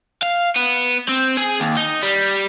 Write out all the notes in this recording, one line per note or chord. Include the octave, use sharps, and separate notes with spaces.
F5
B3
C4
G#4
D#2
D#4
G3